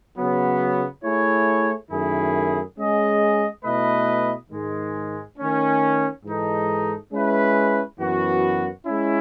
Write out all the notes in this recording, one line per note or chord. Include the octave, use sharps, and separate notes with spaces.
C#3 F#3 B3
A3 E4 G#4 C#5
F#2 D#3 A3 E4 G#4
G#3 C#4 G#4 D#5
B2 A3 E4 B4 D#5
G#2 D#3 G#3
D#3 A3 C#4
G#2 E3 G#3 D#4 A4
G#3 C#4 E4 B4
F#2 E3 B3 F#4
G#3 C#4 E4